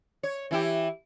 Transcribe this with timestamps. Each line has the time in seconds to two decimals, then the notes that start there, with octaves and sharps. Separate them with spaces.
0.23 C#5
0.51 E3 E4 G4